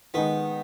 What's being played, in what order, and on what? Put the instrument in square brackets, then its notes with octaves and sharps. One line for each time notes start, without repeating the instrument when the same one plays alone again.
[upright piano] D#3 G#3 D#4 [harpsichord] B3